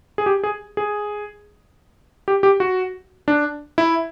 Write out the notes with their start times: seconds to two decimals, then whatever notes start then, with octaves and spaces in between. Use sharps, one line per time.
0.18 G#4
0.26 G4
0.44 G#4
0.77 G#4
2.28 G4
2.43 G4
2.60 F#4
3.28 D4
3.78 E4